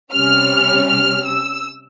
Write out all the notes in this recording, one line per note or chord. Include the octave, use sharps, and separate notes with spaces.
C3 G3 C#4 F6
F6
E6